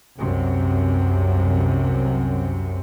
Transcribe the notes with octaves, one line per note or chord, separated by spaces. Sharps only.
C2 F#2 C3